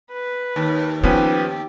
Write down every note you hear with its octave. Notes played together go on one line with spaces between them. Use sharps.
B4
D#2
F3 B3 C#4 G4 B4